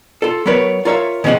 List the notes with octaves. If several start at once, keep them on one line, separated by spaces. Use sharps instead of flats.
F4 A4
F#3 B3 A#4 B4 C#5
F4 A#4 C#5 E5 F5
C#3 F3 C4 C#5 D#5 F#5